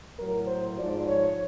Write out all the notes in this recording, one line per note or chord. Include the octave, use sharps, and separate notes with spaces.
A2 F#3 A#4
C5
G#2 F3 D5
C#5